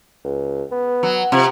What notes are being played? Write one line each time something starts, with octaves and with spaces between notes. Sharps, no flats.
C#2
B3
F#3
C3 F3